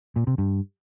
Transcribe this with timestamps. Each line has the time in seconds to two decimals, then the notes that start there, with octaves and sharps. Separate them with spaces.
0.16 A#2
0.27 C3
0.38 G2